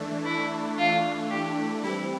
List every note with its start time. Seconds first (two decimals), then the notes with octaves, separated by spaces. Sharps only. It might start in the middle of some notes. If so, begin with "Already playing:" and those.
Already playing: E3 A3 D4
0.25 E4
0.78 F4
1.30 G4
1.83 E3 G3 C4 E4 G4